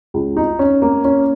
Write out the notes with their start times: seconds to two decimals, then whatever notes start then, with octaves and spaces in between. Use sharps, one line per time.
0.14 C#2
0.37 D#4
0.59 C#4
0.82 A#3
1.05 C#4